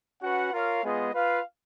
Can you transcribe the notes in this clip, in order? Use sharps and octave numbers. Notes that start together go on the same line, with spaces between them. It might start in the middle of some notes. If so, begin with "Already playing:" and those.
C#4 F#4 B4 F#5
F4 A#4 C#5 F5
G#3 B3 F4 G#4 D#5
F4 B4 F5